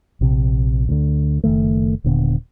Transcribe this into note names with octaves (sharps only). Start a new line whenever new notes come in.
A#1 C3
D2 D3
F#1 D#2 D#3 A3
D#1 A#2 D3 B3